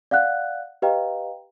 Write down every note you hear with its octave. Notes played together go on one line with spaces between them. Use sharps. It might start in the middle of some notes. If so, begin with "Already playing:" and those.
D5 F5 F#5 F#6
G4 B4 D#5 F5 G5 A#5